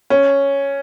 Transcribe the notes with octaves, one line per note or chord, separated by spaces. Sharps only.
C#4